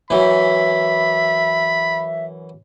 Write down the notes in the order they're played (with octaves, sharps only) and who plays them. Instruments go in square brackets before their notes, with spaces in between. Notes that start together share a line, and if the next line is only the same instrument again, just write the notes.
[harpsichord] F#2 E3 [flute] E5 [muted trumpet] B5